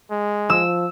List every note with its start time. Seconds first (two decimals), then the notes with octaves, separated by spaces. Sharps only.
0.10 G#3
0.50 F3 E6